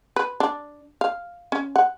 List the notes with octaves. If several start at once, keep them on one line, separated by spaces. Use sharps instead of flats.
B4
D4
F5
C#4
F#5